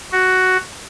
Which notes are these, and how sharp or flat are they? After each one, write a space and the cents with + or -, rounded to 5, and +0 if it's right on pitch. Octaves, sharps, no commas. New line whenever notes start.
F#4 +5